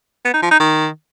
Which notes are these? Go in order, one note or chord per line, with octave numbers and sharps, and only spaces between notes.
B3
D#4
F3
D#4
D#3